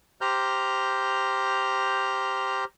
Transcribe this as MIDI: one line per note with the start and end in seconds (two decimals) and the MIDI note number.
0.21 2.64 67
0.21 2.64 72
0.21 2.64 82
0.21 2.64 89
0.21 2.64 91